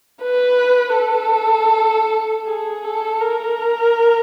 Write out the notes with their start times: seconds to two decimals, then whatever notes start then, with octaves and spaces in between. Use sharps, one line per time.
0.22 B4
0.97 A4
2.47 G#4
2.84 A4
3.22 A#4